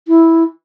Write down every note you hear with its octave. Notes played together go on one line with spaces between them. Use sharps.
E4